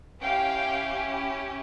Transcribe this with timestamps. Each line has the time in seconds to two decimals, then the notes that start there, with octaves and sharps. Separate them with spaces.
0.22 C#4 E4 G4 F5 G5